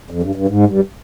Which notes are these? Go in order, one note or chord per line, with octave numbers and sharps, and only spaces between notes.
F2
G2
G2
G#2
G2